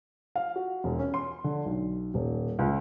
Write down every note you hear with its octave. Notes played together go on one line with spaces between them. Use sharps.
F5
F#4
E1
C#4
C6
D3
B1
D#1
C#2